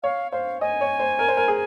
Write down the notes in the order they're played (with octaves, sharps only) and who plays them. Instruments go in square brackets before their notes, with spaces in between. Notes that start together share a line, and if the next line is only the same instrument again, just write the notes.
[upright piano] C#5 [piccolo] F5
[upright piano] C5 [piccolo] F5
[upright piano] D#5 [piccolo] G#5
[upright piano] C#5
C5
A#4
C5
A#4
G#4